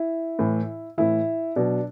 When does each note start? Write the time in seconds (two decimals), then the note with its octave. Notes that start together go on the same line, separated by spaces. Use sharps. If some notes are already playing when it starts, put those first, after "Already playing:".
Already playing: E4
0.39 A2 E3
0.98 A2 E3 E4
1.56 B2 F#3 D4